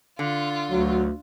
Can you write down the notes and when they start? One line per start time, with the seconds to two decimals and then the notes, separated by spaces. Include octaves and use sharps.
0.19 D3 F4
0.71 D2 F#3